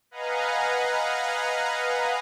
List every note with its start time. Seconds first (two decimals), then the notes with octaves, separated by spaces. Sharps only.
0.11 B4 D#5 F5 F#5 G#5 A#5